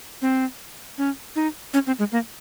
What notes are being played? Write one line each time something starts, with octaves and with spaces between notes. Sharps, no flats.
C4
C#4
D#4
C#4
C4
G#3
A#3